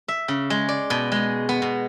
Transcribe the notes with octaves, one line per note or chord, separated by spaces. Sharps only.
E5
C#3
G#3
D5
B2
G#3
B3
B2